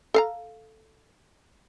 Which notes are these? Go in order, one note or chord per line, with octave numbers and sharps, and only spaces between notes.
A4 F5 A#5